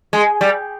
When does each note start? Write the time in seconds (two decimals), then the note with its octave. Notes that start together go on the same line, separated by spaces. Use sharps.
0.13 G#3
0.41 G3